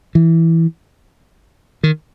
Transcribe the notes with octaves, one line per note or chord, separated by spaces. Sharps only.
E3
D#3